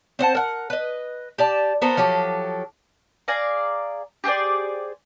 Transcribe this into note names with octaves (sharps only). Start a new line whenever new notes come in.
C4 C5 F#5 A5
A#4 F#5
B4 D#5
G4 D5 A5
B3 A4 A#4 C5
F3 F#3 G4 A4
G#4 D5 F5 A#5
G4 G#4 C5 D5